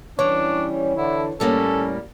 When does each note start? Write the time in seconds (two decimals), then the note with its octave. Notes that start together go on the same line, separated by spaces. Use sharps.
0.19 E3 G3 C#4 D4 C#5
0.97 D3 E4
1.40 A2 G3 A#3 C#4 A4